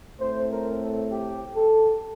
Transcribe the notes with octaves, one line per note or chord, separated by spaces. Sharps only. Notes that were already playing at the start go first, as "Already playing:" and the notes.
A2 A3 C4 C5
A#4
A4
G4
A4